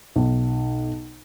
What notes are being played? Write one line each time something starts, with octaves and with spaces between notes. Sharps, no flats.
B1